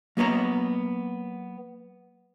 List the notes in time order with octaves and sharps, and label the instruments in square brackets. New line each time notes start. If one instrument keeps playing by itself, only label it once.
[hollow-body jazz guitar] F#3 A#3 B3 C#5 A#5